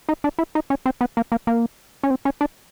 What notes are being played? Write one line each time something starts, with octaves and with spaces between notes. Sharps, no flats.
D#4
D4
E4
D#4
C#4
C4
B3
A#3
A#3
A#3
C#4
C4
C#4
D4